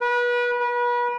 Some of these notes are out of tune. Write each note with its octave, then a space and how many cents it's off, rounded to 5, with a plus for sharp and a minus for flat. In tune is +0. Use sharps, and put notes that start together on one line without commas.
B4 -30
B4 -35